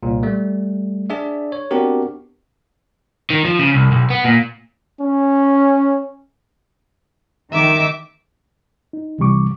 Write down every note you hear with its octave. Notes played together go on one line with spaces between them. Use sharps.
C2 A#2
G3 A3
D4 G#4 D5 E5
C#5
B3 C4 D4 F#4 G4 A#4
D#3
F3
C#3
C2
B1
B3
A#2
C#4
D#3 E5 D6
D#4
C2 C3 E3 G3 C#6 D6